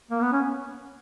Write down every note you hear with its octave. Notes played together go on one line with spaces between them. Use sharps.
A#3
B3
C#4